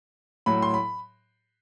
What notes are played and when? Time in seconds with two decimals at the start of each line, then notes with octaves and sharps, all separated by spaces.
0.46 A2 F#3 B5
0.62 C6
0.74 B5